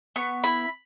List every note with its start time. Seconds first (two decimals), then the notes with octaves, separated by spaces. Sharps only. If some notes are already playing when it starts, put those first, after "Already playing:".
0.16 B3 C#6
0.44 E4 B5